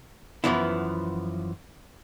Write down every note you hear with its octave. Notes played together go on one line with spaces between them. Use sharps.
F#2 B2 E3 F3 B3 E4